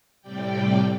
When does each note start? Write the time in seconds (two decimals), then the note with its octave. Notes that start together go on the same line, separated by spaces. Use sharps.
0.21 A2 C3 G3 D5 G5